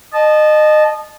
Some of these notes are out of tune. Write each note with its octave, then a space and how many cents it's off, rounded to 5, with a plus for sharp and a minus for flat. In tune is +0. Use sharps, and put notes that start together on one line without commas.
D#5 -25 A5 -20